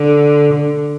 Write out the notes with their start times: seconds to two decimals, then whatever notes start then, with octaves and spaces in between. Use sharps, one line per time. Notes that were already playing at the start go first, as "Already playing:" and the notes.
Already playing: D3
0.53 D3